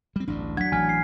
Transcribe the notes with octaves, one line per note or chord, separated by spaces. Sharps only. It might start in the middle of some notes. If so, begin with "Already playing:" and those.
G3 C4
A1 D2 G2 D4
F#3 D4 F#5 G#6 B6
A1 E3 G#5 F6 G#6
C7